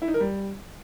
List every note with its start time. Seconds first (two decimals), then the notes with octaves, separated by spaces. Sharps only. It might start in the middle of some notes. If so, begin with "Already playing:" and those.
0.02 E4
0.08 D#4
0.14 A#4
0.20 G3